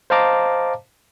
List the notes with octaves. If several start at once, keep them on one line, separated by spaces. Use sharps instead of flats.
C5 D#5 F5 A5 A#5 D6